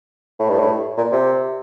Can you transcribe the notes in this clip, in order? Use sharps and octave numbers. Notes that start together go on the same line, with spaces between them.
A2
G2
A2
A#2
C3